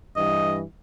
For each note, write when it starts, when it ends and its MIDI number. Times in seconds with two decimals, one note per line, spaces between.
0.17 0.64 43
0.17 0.64 52
0.17 0.64 55
0.17 0.56 75